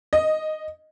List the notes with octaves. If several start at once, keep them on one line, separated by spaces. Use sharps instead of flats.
D#5